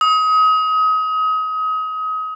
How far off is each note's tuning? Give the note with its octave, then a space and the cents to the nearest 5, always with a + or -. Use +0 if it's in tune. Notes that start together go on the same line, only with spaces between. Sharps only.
D#6 +30